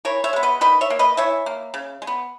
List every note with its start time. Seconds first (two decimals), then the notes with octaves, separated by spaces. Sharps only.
0.05 E3 A#4 C#5
0.24 C#5 E5
0.33 G#3 B3
0.43 B4 D#5
0.61 D#3 B4 D#5
0.81 C#5 E5
0.90 A#3
0.99 B4 D#5
1.17 E3 C#5 E5
1.46 A#3
1.74 C#3
2.02 G#3
2.07 B3